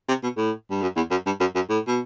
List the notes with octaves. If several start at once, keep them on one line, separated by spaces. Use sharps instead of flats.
C3
B2
A2
G2
F#2
E2
F#2
G2
F#2
F#2
A2
B2